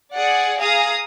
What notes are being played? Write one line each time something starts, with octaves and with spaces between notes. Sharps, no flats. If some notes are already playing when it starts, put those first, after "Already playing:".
G#4 D5 F#5
G#4 F5 A#5 D#6